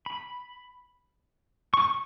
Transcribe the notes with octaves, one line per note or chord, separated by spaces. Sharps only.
B5
C#6